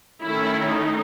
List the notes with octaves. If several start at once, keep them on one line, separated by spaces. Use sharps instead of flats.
D#3 A3 C#4 E4
D#4